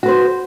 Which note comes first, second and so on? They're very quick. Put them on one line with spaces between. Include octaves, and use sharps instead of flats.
F#4 B4 C5